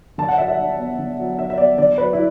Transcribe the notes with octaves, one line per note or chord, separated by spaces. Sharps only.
D3 A5
F#5
F#3 E5
E5
D4
B3
D3
F#3
D4 E5
E5
B3 D5
D3 D5
F#3 B4
E4